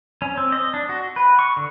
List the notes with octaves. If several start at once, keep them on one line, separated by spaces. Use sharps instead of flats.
C#4
C4
D#5
D4
F#4
B4
C#6
D3